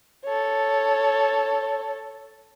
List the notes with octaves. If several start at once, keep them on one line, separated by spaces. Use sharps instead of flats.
A4 C#5